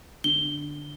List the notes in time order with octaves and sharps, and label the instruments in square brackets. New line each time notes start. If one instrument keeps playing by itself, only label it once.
[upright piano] D3 [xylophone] G7